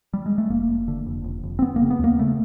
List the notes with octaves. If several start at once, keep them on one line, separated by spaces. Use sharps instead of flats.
G3
G#3
A3
F1 A#3
F1
D3
F1
F1
F1
C4
F1 B3
A#3
C#3
B3
D#2 A#3
C#3 A3